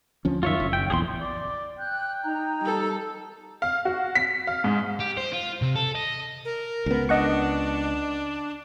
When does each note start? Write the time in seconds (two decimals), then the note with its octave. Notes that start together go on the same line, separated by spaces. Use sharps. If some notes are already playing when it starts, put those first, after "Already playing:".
0.25 D2 F3 C#4
0.43 F#2 D#3 F4 C#5 E5
0.60 F#1
0.73 G5
0.90 A#1 E2 G#4 C6
1.21 D5
1.79 G5 F#6 G6
2.23 D#4 A#5
2.61 G3 A4
3.62 F5
3.85 F#4
4.15 B6
4.47 F5
4.64 G#2
5.00 G4
5.17 C5
5.33 F4
5.62 C3
5.75 A4
5.95 D#5
6.45 A#4
6.86 C#2 B3
7.09 D4 D#5 F#5 C#6